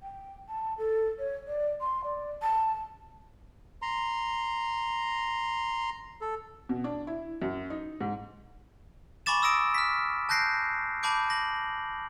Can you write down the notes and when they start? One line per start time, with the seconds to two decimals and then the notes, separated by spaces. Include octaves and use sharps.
0.03 G5
0.48 A5
0.78 A4
1.19 C#5
1.47 D5
1.81 C6
2.04 D5
2.42 A5
3.82 A#5 C6
6.21 A4
6.69 B2
6.84 D4
7.07 E4
7.42 F#2
7.70 D#4
8.01 G#2
9.26 G#5 B5 C#6 D6 A6 E7
9.42 D#6 E6 A#6 D7 E7
9.74 F6 B6
10.29 A5 F#6 G6 A#6 C7 D7
11.03 A5 B5 D6 G6 D7
11.30 A#6 F#7